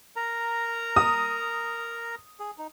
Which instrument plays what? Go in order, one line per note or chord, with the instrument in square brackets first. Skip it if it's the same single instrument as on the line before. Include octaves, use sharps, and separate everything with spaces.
[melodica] A#4 A#5
[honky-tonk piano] D#6
[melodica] G#4
D#4